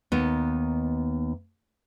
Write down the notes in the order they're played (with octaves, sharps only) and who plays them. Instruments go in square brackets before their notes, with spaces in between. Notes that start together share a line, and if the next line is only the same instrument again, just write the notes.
[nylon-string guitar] D#2 B3 D#4